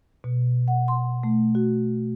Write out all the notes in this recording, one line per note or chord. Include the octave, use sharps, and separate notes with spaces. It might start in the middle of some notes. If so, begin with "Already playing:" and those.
B2
F#5
C6
A3
F#4